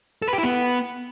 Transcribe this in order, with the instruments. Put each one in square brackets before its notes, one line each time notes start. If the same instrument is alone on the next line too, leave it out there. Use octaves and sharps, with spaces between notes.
[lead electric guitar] A4
B4
G4
E4
B3